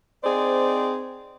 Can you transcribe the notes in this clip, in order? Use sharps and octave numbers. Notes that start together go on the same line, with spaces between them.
C4 D#4 G#4 C5 D5